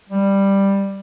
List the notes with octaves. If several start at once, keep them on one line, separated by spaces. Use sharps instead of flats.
G3